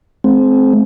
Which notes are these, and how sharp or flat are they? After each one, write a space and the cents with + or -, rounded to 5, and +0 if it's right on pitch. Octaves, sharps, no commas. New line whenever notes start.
G#3 +45 C4 +0